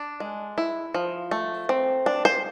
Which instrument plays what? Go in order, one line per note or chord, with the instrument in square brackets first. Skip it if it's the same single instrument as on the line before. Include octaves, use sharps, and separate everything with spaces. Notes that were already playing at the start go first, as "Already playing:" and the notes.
Already playing: [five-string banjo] D4
G#3
E4
F3
A3
C4
D4
C5